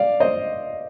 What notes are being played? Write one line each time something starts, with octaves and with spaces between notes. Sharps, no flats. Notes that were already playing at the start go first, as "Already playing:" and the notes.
Already playing: D5 F5
C5 D#5